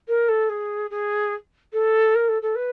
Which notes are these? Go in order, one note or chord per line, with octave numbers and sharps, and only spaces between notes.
A#4
A4
G#4
G#4
A4
A#4
A4
A4
B4